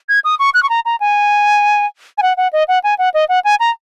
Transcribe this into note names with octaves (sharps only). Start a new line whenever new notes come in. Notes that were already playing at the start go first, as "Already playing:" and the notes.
G#6
D#6
C#6
F#6
C#6
A#5
A#5
G#5
G#5
F#5
F#5
D#5
F#5
G#5
F#5
D#5
F#5
G#5
A#5